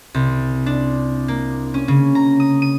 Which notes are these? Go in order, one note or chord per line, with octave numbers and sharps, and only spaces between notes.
C2
D4
A#3
C#4
C#3
A#5
D#6
D#7